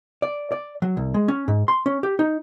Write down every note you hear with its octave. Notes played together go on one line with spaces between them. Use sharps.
D5
D5
F#3
C2
G#3
C#4
G#2
C6
C#4
G4
D#4